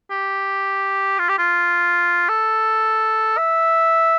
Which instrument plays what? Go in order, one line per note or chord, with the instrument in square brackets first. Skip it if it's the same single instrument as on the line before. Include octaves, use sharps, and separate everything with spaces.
[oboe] G4
F4
G4
F4
A4
E5